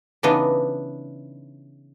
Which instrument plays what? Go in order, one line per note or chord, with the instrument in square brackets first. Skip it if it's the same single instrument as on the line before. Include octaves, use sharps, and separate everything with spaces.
[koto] C#3 E3 B3 D4 D#4 D#5